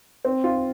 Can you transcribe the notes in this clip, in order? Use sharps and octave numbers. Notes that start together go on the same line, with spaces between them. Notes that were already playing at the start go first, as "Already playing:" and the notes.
C4
F4